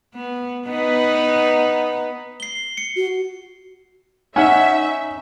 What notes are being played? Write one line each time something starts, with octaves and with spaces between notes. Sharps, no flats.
B3
B3 D#4 B4
C7 G7
C#7
F#4
C#4 D#4 E5 F#5 G#5